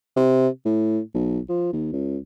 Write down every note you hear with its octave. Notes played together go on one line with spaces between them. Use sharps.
C3
A2
B1
F3
D#2
C#2